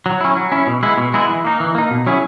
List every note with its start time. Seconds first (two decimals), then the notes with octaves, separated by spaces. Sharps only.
0.06 F#3
0.21 C#4 E4
0.37 F#3
0.52 C#4 E4
0.67 B2
0.83 G#3 B3 E4
0.98 B2
1.14 G#3 B3 E4
1.29 E3
1.45 A#3 D#4
1.60 E3
1.75 A#3 D#4
1.91 B2
2.07 F#3 C#4 E4 G#4